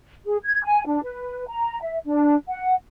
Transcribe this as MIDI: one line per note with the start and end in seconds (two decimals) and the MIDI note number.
0.25 0.37 68
0.44 0.62 92
0.63 0.85 80
0.86 0.99 62
1.03 1.48 71
1.48 1.79 82
1.82 1.98 76
2.05 2.36 62
2.48 2.73 78